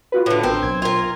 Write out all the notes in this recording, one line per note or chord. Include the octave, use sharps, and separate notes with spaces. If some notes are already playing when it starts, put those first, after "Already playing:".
F4 F#4 B4
A2 D3
A1 C4 A#4
B1 G#6
F4 A#4